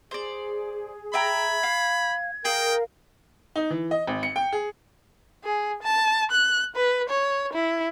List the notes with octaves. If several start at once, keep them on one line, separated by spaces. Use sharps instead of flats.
G#4 C5 D5
E5 G5 A#5 B5 G#6
F5
G#4 A#4 F5 G5
D#4
E3
D#5
G#1
C#7
G5
G#4
G#4
A5
F#6
B4
C#5
E4